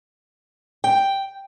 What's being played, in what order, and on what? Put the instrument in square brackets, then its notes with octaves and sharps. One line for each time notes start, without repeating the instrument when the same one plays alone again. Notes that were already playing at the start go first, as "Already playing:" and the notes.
[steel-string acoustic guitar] G5